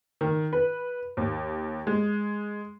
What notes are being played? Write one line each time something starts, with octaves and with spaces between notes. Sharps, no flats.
D#3
B4
D#2
G#3